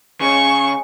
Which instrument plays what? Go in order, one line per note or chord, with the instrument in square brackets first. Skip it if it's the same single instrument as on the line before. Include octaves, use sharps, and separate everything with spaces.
[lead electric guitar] C#3 [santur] G#3 C#4 [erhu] C#6